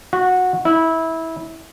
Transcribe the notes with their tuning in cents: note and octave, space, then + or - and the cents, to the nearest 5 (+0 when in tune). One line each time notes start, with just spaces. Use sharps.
F#4 -15
E4 -20